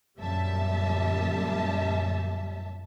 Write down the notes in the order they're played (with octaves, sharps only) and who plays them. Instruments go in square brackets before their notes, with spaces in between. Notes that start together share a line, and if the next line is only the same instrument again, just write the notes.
[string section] G1 F#2 A#2 G3 E5 A5